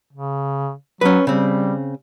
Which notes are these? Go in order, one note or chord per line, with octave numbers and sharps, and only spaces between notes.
C#3
F#3 C#4 B4
C#3 G3 C4